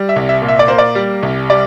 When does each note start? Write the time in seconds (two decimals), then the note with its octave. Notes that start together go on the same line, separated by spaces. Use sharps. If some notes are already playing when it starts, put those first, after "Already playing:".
Already playing: G3
0.09 E5
0.16 C2
0.29 E5
0.42 A#2
0.48 E5
0.59 D5
0.68 A#3 C5
0.78 D5
0.95 G3
1.23 C2
1.50 G3 D5